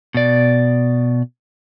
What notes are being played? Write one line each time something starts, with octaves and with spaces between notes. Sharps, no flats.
B2 D5